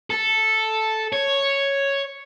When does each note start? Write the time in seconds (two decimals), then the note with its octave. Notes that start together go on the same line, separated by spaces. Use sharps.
0.11 A4
1.13 C#5